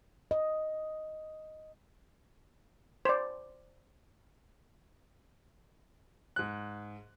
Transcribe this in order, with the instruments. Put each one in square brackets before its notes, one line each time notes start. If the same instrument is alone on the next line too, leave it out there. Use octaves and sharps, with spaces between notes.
[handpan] D#5
[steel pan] C5 D5
[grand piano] G#2 F#6